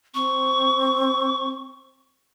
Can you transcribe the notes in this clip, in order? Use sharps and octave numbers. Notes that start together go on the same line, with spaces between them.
C4 C#6